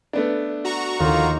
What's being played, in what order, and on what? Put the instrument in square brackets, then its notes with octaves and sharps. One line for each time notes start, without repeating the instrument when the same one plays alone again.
[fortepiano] A3 B3 D4
[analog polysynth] F#4 A#5 C#6
[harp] D#2 [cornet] F4